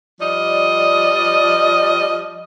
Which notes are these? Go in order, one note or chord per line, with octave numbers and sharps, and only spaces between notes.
F3 G3 D5 D#5